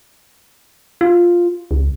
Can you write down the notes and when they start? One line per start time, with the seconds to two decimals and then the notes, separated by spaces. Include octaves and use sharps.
1.01 F4
1.71 C#2